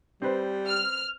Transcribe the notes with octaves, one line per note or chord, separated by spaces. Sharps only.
G3 C4 B4 C5
F6